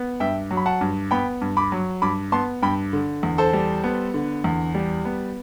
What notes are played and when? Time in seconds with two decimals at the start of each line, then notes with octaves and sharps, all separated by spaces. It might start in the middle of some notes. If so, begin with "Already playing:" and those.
Already playing: B3
0.20 G2 E5 G5
0.51 F#3
0.57 B5
0.66 F#5 A5
0.81 G2
1.11 B3 G5 B5
1.41 G2
1.57 B5 D6
1.72 F#3
2.02 G2 B5 D6
2.32 B3 A5 C6
2.62 G2 G5 B5
2.93 D3
3.23 E2
3.38 A4 C5
3.53 G3
3.84 B3
4.14 D3
4.44 E2
4.75 G3
5.05 B3